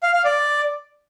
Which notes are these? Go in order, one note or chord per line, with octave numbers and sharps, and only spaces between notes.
F5
F5
D5